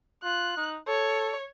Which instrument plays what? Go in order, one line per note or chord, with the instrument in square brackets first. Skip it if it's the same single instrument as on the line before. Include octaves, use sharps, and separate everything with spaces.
[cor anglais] F4 [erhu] F#6
[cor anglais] D#4
[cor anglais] A4 [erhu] C#5